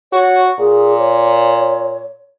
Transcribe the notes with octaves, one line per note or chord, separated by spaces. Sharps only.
F#4 C#5
A#2 G#4
C#5